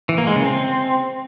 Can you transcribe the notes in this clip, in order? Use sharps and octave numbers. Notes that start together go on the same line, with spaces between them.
E3
A#3
G#3
C#3
C4